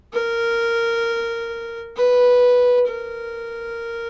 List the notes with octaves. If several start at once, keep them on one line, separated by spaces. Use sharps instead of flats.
A#4
B4
A#4